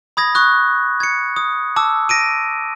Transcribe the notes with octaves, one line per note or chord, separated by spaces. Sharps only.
B5 D#6 G#6 A#6
C#6 D#6 F#6
G#6 C#7
D#6
A5 D6 E6
A#6 D7 D#7